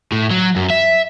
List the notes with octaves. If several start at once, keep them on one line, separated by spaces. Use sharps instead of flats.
A2
F#3
F#2
E5